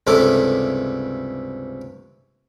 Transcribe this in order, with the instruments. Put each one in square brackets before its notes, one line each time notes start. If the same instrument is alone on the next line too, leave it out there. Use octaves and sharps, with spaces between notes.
[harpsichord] C#2 G2 C3 E4 A4 D6